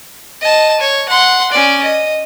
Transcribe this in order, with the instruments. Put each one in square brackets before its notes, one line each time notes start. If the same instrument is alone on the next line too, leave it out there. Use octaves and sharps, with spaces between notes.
[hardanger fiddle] D#5 A5
C#5
F#5 C6
C#4 D5
D#5